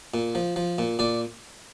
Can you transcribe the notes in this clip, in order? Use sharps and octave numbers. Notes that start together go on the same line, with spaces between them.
A#2
F3
F3
A#2
A#2 D5